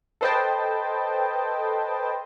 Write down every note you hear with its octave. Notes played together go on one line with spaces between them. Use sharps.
A4 B4 C5 D#5 G5 A5